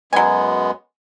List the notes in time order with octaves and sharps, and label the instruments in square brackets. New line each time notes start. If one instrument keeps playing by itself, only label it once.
[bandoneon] F#2 G#3 B3 [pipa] F#3 G#5